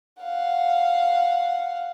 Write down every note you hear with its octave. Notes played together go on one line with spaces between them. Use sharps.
F5 F#5